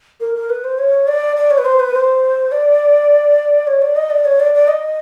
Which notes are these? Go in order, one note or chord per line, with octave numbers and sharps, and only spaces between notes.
A#4
A#4
B4
C5
C#5
D5
D5
C#5
B4
C5
B4
C5
D5
C#5
D5
D#5
D5
C#5
D5
D5
D#5